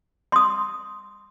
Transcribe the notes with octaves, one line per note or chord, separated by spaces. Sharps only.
C6 D#6